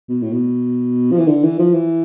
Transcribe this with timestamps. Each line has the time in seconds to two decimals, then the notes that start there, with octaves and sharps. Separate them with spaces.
0.09 B2
0.22 A2
0.32 B2
1.12 F3
1.18 E3
1.27 D3
1.43 E3
1.59 F3
1.74 E3